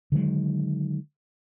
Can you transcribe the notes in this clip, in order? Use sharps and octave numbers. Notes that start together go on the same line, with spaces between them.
D3 D#3 F#3 G#3